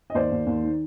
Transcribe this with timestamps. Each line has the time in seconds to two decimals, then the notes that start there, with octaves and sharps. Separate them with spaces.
0.10 D#5
0.14 D#2 C5 D5
0.31 D#2
0.47 D#2
0.63 D#3